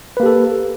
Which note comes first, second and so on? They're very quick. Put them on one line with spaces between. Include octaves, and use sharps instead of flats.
B4 A#3 G4 A4